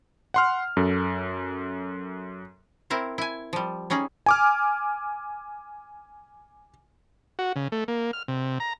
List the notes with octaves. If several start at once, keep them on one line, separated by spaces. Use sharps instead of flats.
F#5 C6 F6
F#2 A4
C4 E4 A#4 C5
E4 G#5
F3 G3
G3 C#4 D#4 G#4
G#5 D6 F6
F#4
C#3
A3
A#3
F6
C3
A#5